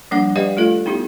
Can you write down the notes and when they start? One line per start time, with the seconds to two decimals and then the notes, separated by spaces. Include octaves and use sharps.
0.11 F3 G3 A#3 D4 F#5 D6
0.36 G4 B4 D5 D#5 F5 G5
0.57 A3 F4 A4
0.86 B3 D#4 E4 G4